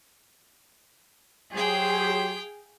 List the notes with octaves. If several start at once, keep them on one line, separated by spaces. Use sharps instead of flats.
F#3 G4 G#4 C5 F5 G5